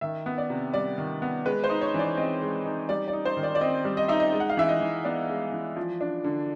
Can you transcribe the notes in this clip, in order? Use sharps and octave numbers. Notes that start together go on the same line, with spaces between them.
D#3 E5
B3
D5
C3
G3 D5
D#3
B3
G#3 B4
C5
D#4
C#5
E3
D5
C4 D#5
G#3
D#4
G3 D5
D5
D#4
C5
D#3
D5
D5
C4 D#5
G3
D#5
D#4 E5
D#5
G#3
F#5
F5
E3 E5
D#5
E3
B3 D5
G#3
E3
F3
D4
D3